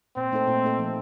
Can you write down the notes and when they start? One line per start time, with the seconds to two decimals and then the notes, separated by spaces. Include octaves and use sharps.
0.16 A#2 C4
0.32 A3 D#4 A4 C5
0.47 A#2
0.63 A3 D#4 A4 C5
0.79 F3